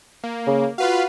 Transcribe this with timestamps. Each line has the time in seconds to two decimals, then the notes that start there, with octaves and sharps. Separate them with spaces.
0.23 A#3
0.47 C#3
0.78 F4 F#4 B4 F5